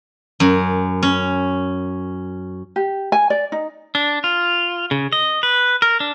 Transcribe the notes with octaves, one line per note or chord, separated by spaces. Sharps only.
F#2
C#4
G4
G#5
D5
D#4
D4
F4
C#3
D#5
B4
A#4
D4